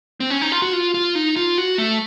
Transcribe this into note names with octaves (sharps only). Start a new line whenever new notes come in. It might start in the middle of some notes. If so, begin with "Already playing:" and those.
C4
C#4
D#4
F4
F#4
F4
F4
D#4
F4
F#4
A3